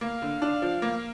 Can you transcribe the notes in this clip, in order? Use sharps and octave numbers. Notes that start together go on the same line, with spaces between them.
A#3 F5
D3
D4
F3
A#3